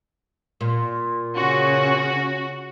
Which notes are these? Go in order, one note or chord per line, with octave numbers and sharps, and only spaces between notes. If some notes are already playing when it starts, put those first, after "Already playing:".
A#2
C#3 C#4 F#4